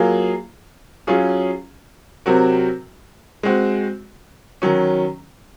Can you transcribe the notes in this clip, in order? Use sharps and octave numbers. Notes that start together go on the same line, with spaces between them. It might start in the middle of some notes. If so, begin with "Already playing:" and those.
Already playing: F#3 A#3 F4 G#4
F#3 C#4 F4 G#4
C3 F#3 C4 F#4 A#4
G#3 C4 F#4
D#3 F#3 C#4